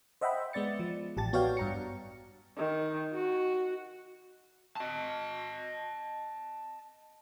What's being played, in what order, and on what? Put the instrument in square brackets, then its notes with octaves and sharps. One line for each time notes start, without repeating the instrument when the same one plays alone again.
[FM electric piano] C5 D#5 E5 F#5 G5 B5
G#3 B3 D5 A6 C#7
F3
A1 G4 A5 A6
B3 F#4 C#5 D5 F5 G5
G2 A#5 C#7
[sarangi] D#3
F#4
[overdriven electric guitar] D#5 A5